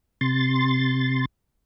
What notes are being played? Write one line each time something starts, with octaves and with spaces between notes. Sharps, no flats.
C3 C6 A6